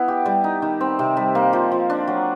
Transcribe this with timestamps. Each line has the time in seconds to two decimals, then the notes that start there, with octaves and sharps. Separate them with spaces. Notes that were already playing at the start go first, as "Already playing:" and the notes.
Already playing: B3 E4
0.08 G4
0.26 G3
0.44 D#4
0.62 D#3
0.81 C4
0.99 C3
1.17 G3
1.35 A#3
1.53 F3
1.72 F3
1.90 D4
2.07 F#3